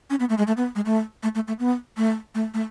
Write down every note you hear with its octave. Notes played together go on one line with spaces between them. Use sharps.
C#4
B3
A3
G#3
A3
B3
G#3
A3
A3
A3
A3
B3
A3
A3
A3